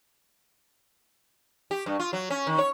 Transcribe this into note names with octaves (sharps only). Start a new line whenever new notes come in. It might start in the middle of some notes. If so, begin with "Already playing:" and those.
G4
G2
F4
F#3
C#4
D#3
C#5